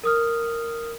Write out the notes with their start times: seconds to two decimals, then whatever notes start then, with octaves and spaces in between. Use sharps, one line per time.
0.04 A#4 D#6 F6